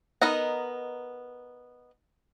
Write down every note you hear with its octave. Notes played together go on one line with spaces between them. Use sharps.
B3 D#4 A#4 D#5 F#5